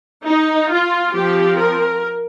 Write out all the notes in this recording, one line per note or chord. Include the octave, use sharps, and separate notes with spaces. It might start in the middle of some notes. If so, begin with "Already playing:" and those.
D#4
F4
F3 C4 G4
A#4